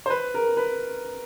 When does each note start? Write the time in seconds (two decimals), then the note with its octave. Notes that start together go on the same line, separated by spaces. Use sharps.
0.06 C5
0.10 B4
0.34 A#4
0.57 B4